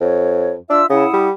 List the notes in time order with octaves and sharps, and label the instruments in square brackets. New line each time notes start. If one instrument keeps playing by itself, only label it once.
[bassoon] F2 [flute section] C#5
[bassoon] D4 [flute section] F4 E5 E6
[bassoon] C#3 [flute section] E4 F#5 D#6
[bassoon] G3